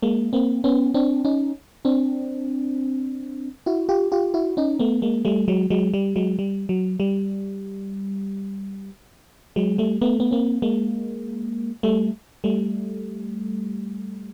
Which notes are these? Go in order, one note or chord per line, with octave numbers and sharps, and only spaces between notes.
G#3 A#3
A#3 C4
B3 C#4
C4 D4
C#4 D#4
C4 D4
E4 F#4
F4 G4
F4 G4
E4 F#4
C#4 D#4
A3 B3
G#3 A#3
G3 A3
F#3 G#3
F#3 G#3
G3
F#3 G#3
G3
F#3
G3
F#3 G#3
G3 A3
A3 B3
B3
A#3 C4
G#3 A#3
G3 A3
G3 A3